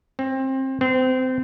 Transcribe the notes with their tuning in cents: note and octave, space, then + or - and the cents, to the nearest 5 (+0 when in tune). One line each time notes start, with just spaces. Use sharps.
C4 +25
C4 -25